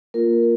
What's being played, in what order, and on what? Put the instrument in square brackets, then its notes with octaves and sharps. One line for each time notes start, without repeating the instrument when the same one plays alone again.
[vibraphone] A#3 F4 A#4